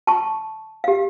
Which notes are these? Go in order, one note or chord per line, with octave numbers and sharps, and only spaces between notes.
A5 C#6
G4 F5